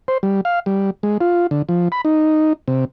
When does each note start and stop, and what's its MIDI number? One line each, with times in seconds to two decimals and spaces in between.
0.08 0.18 72
0.23 0.41 55
0.45 0.60 77
0.66 0.90 55
1.03 1.18 56
1.21 1.47 65
1.51 1.62 50
1.69 1.88 53
1.92 2.01 83
2.05 2.53 63
2.68 2.85 48